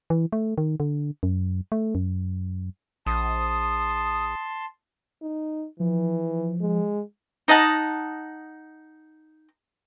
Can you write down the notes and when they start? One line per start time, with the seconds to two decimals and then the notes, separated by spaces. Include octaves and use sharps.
0.10 E3
0.32 A3
0.58 D#3
0.80 D3
1.23 F#2
1.72 A3
1.95 F#2
3.06 A#1 A5 C6 D#6
5.22 D#4
5.80 E3 F3
6.61 G#3
7.48 D#4 D#5 F#5 A5